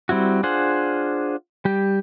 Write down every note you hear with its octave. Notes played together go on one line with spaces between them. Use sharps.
G3 C4 E4 F#4
D4 F4 G#4 C5 F#5
G3 G4